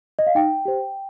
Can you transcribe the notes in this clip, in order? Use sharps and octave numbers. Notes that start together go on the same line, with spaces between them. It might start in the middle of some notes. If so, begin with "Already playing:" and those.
D#5
F5
D#4 G5
G4 C5